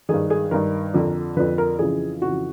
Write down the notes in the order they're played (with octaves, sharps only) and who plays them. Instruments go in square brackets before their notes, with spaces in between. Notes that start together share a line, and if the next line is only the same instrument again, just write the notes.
[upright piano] G2 D#3 G#4
G#4
G2 D#3 A#4
F2 D3
F2 D3 B4
A#4
F2 C#3 E3 G#4
F2 C#3 E3 F#4